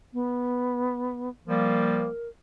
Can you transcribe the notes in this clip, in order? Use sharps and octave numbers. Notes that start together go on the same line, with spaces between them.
B3
F3 G3 A#3 A#4